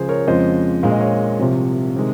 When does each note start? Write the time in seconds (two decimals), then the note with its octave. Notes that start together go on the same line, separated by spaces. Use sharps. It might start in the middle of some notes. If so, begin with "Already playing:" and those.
Already playing: C#2 C#3 F3 G#4 C5
0.09 A#4 C#5
0.27 F2 C#3 F3 G#3 C5 D#5
0.83 A#1 A#2 G#3 F5
0.92 D#5
1.00 C#5 F5
1.39 C2 C3 F3
1.96 C3 D#3 G#3